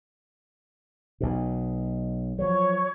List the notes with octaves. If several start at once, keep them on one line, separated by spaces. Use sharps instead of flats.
B1 B2
F3 F#3 C#5